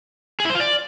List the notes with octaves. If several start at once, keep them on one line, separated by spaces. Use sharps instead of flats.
G#4
E4
C5
F4
D5